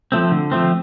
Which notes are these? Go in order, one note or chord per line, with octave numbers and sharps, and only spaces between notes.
F3 A3 C4
D3
F3 A3 C4